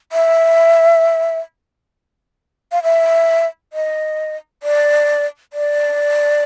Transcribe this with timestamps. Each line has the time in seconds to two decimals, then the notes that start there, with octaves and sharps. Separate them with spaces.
0.12 E5
2.72 F5
2.83 E5
3.73 D#5
4.63 D5
5.53 D5